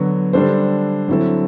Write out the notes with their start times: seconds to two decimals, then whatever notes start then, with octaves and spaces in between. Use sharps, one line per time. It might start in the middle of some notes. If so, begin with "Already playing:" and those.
Already playing: D3 F#3 B3 F#4
0.33 D3 G3 D4 A4 C5
1.08 D3 F#3 C4 E4 A4